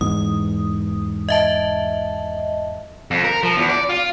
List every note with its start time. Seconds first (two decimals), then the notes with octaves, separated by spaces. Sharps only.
0.01 E2 G#2 D#6
1.29 D#5 E5 A5
3.11 F2
3.24 A#4
3.43 F3
3.57 E2
3.70 D5
3.89 F4